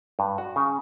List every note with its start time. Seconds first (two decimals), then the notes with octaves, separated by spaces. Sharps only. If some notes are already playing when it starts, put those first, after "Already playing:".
0.19 G2
0.38 F#4
0.56 C#3